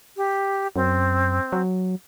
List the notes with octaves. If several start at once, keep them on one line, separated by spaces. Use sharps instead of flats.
G4
F#2 C4
F#3